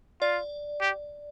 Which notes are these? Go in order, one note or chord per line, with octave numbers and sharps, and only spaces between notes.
F4 D5
G4